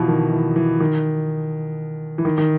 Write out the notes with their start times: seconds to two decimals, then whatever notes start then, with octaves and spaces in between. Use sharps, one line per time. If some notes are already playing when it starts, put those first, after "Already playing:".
Already playing: B2 E3 F3
0.08 D#3
0.32 E3
0.56 E3
0.80 D#3
2.18 E3
2.25 D#3
2.38 D#3